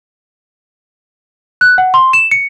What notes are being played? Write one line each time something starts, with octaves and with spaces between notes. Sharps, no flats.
F#6
F#5
C6
E7
C#7